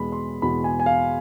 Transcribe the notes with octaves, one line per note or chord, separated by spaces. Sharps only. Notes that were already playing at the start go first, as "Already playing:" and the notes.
Already playing: E2 B2 G#3 B5
C6
E2 B2 G#3 B5
G#5
G#5
F5